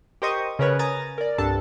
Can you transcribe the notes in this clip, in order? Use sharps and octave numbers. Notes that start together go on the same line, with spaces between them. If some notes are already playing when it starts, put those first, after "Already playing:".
G4 A#4 C5 D#5 C#6 D#6
C#3 C#4 A#4 B4 C#5
G#5 A#5 D#6 A6
A#4 D5
C2 G2 D4 A4 A5